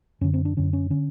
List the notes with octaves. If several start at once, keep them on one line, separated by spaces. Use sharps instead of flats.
F#2 D3 C#4
C4
D4
F#2 D3 C#4
C#4
D3 C#4